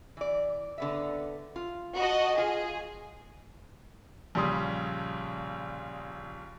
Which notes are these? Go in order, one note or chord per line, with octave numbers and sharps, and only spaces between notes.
E3 D5
D3 B3 E5
F4
F#4 D#5 A5
F4 G#4
A#1 C#3 G3 C6 D#6